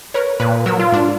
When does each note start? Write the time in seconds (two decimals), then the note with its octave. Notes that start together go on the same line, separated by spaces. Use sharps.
0.14 A#4 B4 C#5
0.40 A#2 B4 F#6
0.66 F#3 A#4 E6
0.79 F4
0.92 G#2 D4